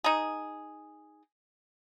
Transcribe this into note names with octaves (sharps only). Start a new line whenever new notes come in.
D#4 G#4